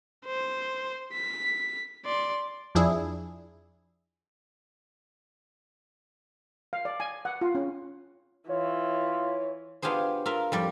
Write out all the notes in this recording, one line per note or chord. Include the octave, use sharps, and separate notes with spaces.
C5
B6
D5 C6
F2 F3 D4 E4 G#4
F5
D5
G#5
F#5
F4
C#4
E3 F4 C#5
B3 D4 F4 G4 G#4 C5
F4 A#4 E5
F2 G3 D5 G5